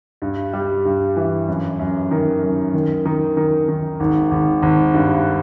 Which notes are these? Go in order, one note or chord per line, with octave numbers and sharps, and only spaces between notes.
G2
G3
G2
E3
F#2
F#2
D#3
F#2
D#3
D#3
D#3
D#3
G#1
G#1
G#1
G2